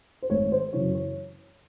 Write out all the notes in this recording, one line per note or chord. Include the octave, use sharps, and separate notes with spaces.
C5
G#1 C#5
C5
F#2 C#3 E3 C#5
C#5